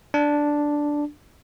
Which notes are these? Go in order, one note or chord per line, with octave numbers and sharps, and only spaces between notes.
D4